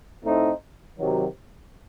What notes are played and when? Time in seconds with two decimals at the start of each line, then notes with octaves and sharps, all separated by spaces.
0.24 A2 A3 C4 D#4
0.99 C3 D#3 F#3